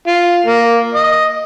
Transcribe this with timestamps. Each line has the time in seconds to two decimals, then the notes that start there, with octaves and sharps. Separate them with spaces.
0.07 F4
0.46 A#3
0.94 D#5